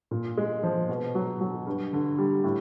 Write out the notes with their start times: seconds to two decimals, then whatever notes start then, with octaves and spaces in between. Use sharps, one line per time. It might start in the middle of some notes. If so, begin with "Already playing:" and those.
0.11 A#2
0.37 G#3
0.63 F3
0.89 B2
1.15 F#3
1.41 F#3
1.67 G2
1.93 D3
2.18 G3
2.44 A2